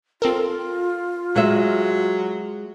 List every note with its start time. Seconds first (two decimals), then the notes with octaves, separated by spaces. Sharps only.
0.22 C4 F4 A4 A#4
1.36 F#3 G#3 E5